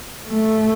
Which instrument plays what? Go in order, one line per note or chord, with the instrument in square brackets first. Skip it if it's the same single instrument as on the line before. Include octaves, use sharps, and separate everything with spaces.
[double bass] A3